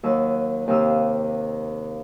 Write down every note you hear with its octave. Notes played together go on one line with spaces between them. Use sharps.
D#2 F#3 E6
D#2 C3 F5 E6